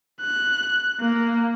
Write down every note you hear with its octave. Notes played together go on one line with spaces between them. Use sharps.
F#6
A#3